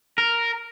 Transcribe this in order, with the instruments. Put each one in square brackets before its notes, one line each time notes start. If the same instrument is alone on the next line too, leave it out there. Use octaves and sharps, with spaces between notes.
[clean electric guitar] A#4